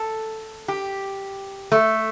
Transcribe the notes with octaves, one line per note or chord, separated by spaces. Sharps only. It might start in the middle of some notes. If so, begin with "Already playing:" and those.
Already playing: A4
G4
A3